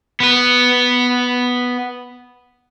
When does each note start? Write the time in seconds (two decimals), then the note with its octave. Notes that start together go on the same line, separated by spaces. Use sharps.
0.20 B3 B4